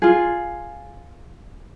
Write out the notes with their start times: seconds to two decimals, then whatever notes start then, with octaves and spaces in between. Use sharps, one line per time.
0.02 F4 G#4